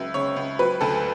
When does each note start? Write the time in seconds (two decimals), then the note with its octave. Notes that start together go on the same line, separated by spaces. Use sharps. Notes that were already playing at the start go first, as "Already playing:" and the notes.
Already playing: C#2 F#3 E5
0.14 C#3 C#5
0.37 C#2
0.59 F#3 B4
0.81 D2 A4